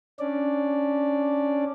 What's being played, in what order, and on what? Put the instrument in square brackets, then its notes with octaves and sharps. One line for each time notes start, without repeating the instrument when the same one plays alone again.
[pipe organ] C#4 D4 D5